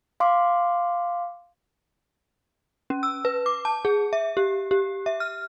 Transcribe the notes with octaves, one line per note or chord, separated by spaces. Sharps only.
F5 C6 D6
C#4
E6
B4
D6
A5
G#4
E5
G4
G4
E5
F6